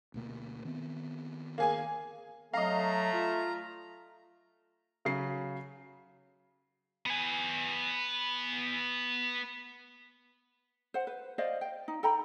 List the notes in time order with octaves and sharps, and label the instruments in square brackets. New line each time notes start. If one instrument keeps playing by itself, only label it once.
[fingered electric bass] D2 B2 A#3
D#3 B3 C4
[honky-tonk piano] A#3 G#4 G#5
[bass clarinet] F#3 [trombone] A3 [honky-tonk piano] D#5 F5 [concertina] A#5
[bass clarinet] F4
[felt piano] C#3 F#3 C7
[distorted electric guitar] B3 G#5
[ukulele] C5 F#5
B4
C5 D5 D#5 F5
G5
D#4
A4 G5 A#5 B5